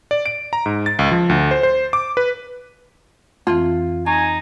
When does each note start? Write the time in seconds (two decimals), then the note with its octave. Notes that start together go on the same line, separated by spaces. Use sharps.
0.11 D5
0.26 D7
0.53 A#5
0.66 G#2
0.86 A6
0.99 C#2
1.11 F3
1.29 D2
1.51 C5
1.63 C5
1.93 D6
2.17 B4
3.47 F2 E3 C4 F4
4.06 D#4 G#5 C#6